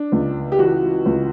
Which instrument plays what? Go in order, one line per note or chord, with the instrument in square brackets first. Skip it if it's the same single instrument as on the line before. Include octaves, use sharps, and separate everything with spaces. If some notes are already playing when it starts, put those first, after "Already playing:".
Already playing: [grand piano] D4
C#2
G4
E3 F#4
C#2